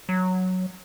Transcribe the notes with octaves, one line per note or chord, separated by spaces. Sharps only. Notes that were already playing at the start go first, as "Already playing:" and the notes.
F#3